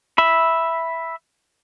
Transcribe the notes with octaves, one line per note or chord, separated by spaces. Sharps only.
E5 B5